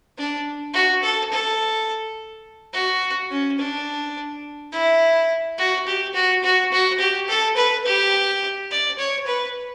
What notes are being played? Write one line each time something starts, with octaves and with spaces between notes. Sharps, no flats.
D4
F#4
A4
A4
F#4
C#4
D4
E4
F#4
G4
F#4
F#4
F#4
G4
A4
B4
G4
D5
C#5
B4